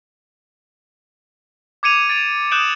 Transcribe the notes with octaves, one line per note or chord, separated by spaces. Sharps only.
D6 G#6 C#7 D#7 F7
A6 D7 D#7 F7
D#6 F#6 G6 D7 E7 F#7